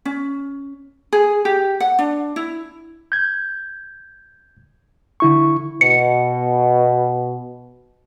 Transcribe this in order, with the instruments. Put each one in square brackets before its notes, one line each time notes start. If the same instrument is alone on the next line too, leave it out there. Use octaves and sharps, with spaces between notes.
[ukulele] C#4
G#4
G4
F#5
D4
E4
[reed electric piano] G6 G#6
D3 E4 C#6
[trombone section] B2 [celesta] C#7